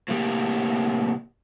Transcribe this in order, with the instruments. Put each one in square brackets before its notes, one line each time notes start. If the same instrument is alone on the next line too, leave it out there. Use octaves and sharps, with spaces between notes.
[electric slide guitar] A2 C3 A#3 G4